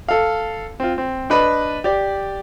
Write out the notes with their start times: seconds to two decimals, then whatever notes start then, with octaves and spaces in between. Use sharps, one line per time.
0.09 A4 F5
0.80 C4 F4
0.98 C4
1.30 D4 B4 D#5 B5
1.84 G4 D5